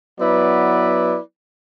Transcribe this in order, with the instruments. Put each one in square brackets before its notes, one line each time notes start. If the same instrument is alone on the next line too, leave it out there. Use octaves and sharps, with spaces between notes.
[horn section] F#3 B3 E4 B4 D5